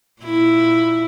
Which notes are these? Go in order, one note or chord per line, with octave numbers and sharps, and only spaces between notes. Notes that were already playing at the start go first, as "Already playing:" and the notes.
A#2 E4